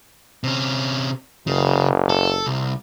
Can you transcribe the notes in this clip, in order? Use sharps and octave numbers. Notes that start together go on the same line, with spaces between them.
C3 C#4
F#1 C#3
A4
C2